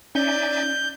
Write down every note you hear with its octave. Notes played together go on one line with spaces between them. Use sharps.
C#4 D#4 D5 E5 G#5 G6